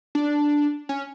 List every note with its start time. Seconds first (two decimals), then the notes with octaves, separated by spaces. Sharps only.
0.15 D4
0.89 C#4